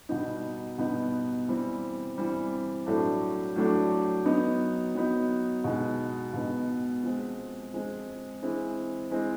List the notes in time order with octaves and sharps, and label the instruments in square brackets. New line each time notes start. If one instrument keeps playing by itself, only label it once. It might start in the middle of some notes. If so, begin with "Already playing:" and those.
[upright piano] B2 G3 B3 D#4
B2 G3 B3 D#4
E3 G3 C4
E3 G3 C4
A2 F#3 A3 D4
A2 F#3 A3 D4
F#3 B3 D#4
F#3 B3 D#4
B2 G#3 B3 D#4
B2 G#3 B3 D#4
F3 G#3 C4
F3 G#3 C4
E3 G#3 C4
E3 G#3 C4